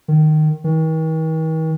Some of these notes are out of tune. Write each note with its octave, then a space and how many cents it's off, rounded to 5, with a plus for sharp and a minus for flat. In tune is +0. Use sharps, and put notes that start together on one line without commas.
D#3 -15
D#3 +45